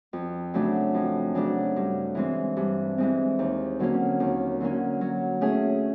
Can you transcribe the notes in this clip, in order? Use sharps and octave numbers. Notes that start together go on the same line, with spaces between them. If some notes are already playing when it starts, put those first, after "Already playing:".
F2
C#3 F#3 A3 D4
F2
C#3 F#3 A3 D4
G2
E3 G#3 C4
G2
E3 G#3 C4
D#2
D3 F#3 A#3 C#4
D#2
D3 F#3 A#3 C#4
F#3
A3 C#4 E4 G#4